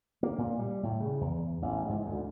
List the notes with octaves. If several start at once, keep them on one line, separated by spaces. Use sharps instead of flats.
A#3
A#2
G3
A2
C#3
E2
A1
G#2
D2